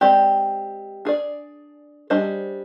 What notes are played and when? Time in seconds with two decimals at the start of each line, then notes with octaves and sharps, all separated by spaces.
0.01 G#3 C4 G4 D5
1.05 D4 G#4 D5
2.10 G3 D4 G#4 C5 D#5